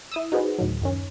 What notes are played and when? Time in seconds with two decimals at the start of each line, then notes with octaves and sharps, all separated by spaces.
0.11 E4 D#6 E6
0.32 D#4 F#4 G#4 B4 C5
0.58 D2 A2 D#3 F#3
0.81 F#2 D#3 C#4